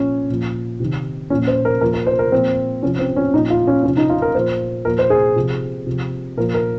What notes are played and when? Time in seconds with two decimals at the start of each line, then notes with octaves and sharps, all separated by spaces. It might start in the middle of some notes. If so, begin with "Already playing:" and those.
Already playing: A#2 F3 C#4
0.29 A#2 F3
0.80 C3 D#3
1.30 A#2 F3 C#4
1.47 C5
1.65 A#4
1.81 A#2 F3 A#4
1.93 A#4
2.07 C5
2.19 A#4
2.32 A#2 F3 C4
2.83 C3 F3 C#4
2.99 C4
3.16 C#4
3.34 A#2 F3 D#4
3.50 F4
3.67 C#4
3.83 C3 F3 C#4
3.97 D#4
4.09 F4
4.22 A#4
4.35 A#2 F3 C5
4.85 A#2 F3 A#4
4.99 C5
5.10 G#4
5.36 C3 F3
5.86 C3 F3
6.37 A#2 F3 A#4
6.54 A#4